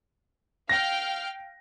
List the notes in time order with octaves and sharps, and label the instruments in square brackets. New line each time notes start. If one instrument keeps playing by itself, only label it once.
[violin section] F5 G5 F6 [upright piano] A#6